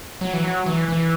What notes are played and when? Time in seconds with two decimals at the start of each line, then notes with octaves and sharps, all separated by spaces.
0.21 F#3
0.33 E3
0.44 F#3
0.66 E3
0.88 E3